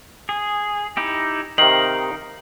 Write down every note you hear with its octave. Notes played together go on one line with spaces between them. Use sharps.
G#4
D#4 E4 G4
C3 D#3 D#4 A#4 F5 F#7